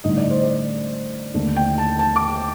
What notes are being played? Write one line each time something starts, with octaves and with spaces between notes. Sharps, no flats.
A1 G2 D3 A3 D#4 D#5
D5
C5
D5
D#2 D3 A3 D4
G5
A5
A5
D6